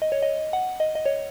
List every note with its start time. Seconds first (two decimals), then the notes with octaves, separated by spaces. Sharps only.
0.02 D#5
0.12 C#5
0.22 D#5
0.53 F#5
0.80 D#5
0.95 D#5
1.06 C#5